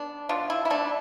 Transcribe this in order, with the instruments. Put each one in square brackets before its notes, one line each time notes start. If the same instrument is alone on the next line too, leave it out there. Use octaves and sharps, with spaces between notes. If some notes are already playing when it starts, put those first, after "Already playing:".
Already playing: [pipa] B3 D4
B2 D4 F4
E4
E4
A3 D4